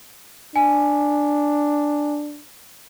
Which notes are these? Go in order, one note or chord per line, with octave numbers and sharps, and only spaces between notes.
D4 G#5